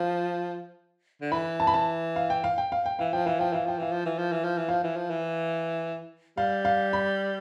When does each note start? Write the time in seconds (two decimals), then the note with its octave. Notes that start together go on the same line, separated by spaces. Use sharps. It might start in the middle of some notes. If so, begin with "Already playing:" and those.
Already playing: F3
1.22 D3
1.32 E3 B5
1.60 A5
1.67 B5
1.74 A5
2.16 F5
2.30 G5
2.44 F5
2.58 G5
2.72 F5
2.86 G5
2.99 E3 F5
3.13 F3 G5
3.27 E3 F5
3.39 F3 G5
3.52 E3 F5
3.66 F3 G5
3.79 E3 F5
3.92 F3
4.06 E3
4.18 F3
4.32 E3
4.44 F3
4.58 E3
4.69 F3 F5
4.83 E3
4.96 F3
5.10 E3
6.37 G3 F5
6.65 F5
6.93 B5